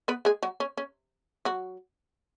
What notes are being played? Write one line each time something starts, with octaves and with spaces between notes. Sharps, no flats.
B3 B4
G#3 G#4
F#3 F#4
C#4
C#4
F#3 F#4